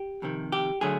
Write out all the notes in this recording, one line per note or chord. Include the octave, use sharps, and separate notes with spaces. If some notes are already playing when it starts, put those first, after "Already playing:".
Already playing: G4
F2 C3 D#3
G4
D3 F#3 A3 G#4